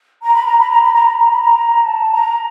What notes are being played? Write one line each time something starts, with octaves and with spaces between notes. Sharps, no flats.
A#5
B5
A#5
B5
A#5
B5
A#5
B5
A#5
B5
A#5
A5
A#5